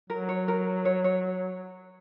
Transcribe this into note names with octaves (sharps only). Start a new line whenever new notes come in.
F#3 A#4
C#5
A#4
C#5
C#5